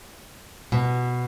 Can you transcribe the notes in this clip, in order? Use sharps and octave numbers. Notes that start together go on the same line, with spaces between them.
B2